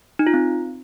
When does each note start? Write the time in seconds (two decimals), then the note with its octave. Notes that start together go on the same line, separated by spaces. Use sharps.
0.19 D#4
0.27 F4
0.34 C4